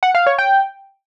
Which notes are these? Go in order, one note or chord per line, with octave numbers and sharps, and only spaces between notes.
F#5
F5
C#5
G5